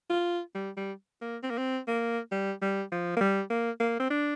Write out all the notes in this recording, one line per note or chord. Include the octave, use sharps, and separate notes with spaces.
F4
G3
G3
A#3
C4
A#3
C4
A#3
G3
G3
F3
A#3
G3
A#3
A#3
C4
D4